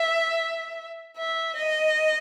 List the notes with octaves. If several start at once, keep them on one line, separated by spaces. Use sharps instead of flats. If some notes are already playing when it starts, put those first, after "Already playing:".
Already playing: E5
E5
D#5